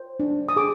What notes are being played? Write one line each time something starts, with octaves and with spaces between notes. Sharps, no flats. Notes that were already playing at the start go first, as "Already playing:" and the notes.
Already playing: C5
D4
D#6
G#4 D6